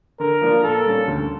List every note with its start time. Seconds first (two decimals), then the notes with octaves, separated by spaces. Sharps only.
0.19 D3 A#4
0.41 F3 A#3 D4 F4
0.63 A#2 A4
0.85 G3 A#3 C#4
1.07 D2